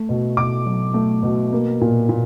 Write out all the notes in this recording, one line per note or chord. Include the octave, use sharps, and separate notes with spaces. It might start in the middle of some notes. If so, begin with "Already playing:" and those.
Already playing: A3
B2
B2 D6
F#3
A3
B2
A#3
A#2
A#2